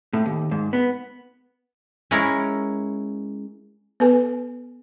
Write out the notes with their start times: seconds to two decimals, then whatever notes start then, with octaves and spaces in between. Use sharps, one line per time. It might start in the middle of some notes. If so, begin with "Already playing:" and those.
0.13 A2
0.26 D#2
0.51 G#2
0.73 B3
2.11 G#3 C#4 E4 A#4
4.00 B3 A4 B4 G#5